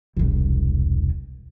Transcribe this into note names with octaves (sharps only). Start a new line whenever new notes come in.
E1 C2